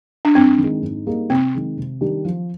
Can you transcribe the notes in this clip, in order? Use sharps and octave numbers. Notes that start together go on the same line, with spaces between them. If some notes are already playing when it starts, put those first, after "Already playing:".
D4
G2 C4
D#3 G#3
G#2
G3 A#3 D#4 G#4
C3 C4
D#3 G#3
C3
D#3 G3 D4 G4
F3